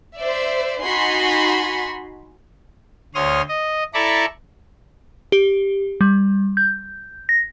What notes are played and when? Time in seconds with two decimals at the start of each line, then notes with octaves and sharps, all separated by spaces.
0.18 C5 D5 E5
0.82 D#4 F#4 G#5 B5 C6
3.15 D2 C#5 C6 D#6 F6
3.49 D#5
3.94 E4 A4 D5 A#5 B5 C#6
5.32 G4
6.01 G3
6.57 G6
7.29 A#6